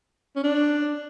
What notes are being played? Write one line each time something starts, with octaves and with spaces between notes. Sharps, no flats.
C#4
D4